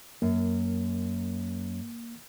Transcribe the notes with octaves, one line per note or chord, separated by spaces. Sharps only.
F#2 A#3